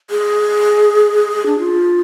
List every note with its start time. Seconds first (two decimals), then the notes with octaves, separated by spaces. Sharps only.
0.10 G#4
1.46 D4
1.58 F4